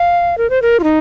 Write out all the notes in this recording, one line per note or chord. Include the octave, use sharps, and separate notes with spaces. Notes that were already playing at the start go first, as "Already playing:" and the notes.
Already playing: F5
A#4
C5
A#4
F4
D#4